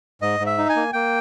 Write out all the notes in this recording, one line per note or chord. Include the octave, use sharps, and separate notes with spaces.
G#2 D#5
G#2
E5
D#4
G#5
A#3
A#3 G5